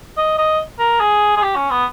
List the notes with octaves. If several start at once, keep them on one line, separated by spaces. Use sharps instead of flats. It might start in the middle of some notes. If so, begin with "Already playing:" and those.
D#5
D#5
A#4
G#4
G#4
G4
C#4
B3